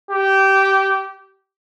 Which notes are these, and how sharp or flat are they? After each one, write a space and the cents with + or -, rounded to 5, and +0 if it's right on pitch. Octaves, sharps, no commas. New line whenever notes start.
G4 -15